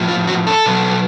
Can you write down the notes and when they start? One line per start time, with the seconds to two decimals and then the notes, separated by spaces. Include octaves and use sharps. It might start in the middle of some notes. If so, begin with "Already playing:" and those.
Already playing: A2 F3
0.08 F4
0.27 F#4
0.47 A4
0.66 B2 F#3